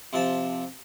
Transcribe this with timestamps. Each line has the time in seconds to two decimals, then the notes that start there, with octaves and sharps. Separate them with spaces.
0.13 C3 F3 A5